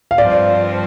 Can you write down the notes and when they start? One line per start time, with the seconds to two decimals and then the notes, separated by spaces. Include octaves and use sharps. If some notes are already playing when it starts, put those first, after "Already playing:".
0.11 F5
0.18 G2 F3 C4 D5